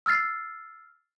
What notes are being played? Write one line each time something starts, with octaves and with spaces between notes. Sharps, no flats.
E6 F6 A6 C7